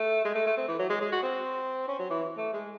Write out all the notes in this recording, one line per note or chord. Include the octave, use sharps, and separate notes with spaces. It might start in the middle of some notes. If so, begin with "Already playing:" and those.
Already playing: A3
G#3
A3
A3
C4
E3
F#3
G#3
G#3
F#4
C4
C#4
F#3
E3
A3
G#3